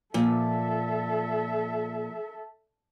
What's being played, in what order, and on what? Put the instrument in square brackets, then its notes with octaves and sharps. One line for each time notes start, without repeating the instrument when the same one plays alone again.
[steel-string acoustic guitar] A#2 [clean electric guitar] F3 [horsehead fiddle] A4 E5